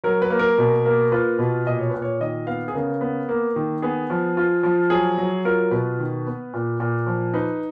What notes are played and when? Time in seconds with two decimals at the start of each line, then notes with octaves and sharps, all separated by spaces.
0.04 F#3 A#4
0.22 B4
0.30 A#3
0.39 A#4
0.58 B2
0.86 A#3
1.12 F4 B4
1.39 B2
1.66 A#2 D#5
1.78 C#5
1.90 A#2 B4
2.02 C#5
2.21 D#3 D#5
2.47 B3 F5
2.68 G#4
2.75 C#3 A#4
3.01 B3
3.29 A#3
3.56 D#3
3.82 B3 G#4
4.10 F3
4.37 F4
4.63 F3
4.90 F#3 G#4
5.18 F#3
5.45 F4 A#4
5.71 B2 B4
5.99 D#3
6.26 B3
6.53 A#2
6.80 A#2
7.06 F3
7.34 D#4 B4